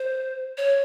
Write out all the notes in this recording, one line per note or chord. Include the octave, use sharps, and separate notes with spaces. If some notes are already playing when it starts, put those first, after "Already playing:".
Already playing: C5
C#5